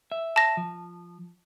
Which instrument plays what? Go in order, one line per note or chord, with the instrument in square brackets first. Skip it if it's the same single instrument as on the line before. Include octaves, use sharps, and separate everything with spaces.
[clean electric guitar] E5
[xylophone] A5 A#6
[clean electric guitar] F3